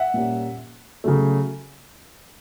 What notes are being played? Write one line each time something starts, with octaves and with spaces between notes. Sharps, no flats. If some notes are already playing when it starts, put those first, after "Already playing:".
Already playing: E5 F#5
A#2 G3 A#3 C#4
C#3 F#3 A3